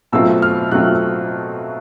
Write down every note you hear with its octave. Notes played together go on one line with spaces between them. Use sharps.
B2 F#3 A3 C4 F4 E6
F6
B2 F#3 A3 C4 F4 F#6